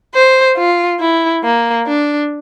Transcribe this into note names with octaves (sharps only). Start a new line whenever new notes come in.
C5
F4
E4
A#3
D4